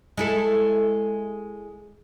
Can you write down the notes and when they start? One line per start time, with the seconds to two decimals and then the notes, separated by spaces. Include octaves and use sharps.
0.17 G#3 E4 A4